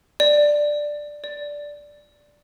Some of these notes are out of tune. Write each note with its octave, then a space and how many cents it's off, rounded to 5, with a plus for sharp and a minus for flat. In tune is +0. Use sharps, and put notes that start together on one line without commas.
D5 +5
D5 -5